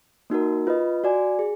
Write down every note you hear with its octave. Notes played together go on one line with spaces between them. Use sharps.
A#3 D#4 F#4 A#4
F4 B4 D#5
F#4 D5 G#5
G#4